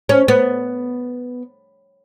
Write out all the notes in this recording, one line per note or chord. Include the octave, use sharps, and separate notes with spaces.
C#4
B3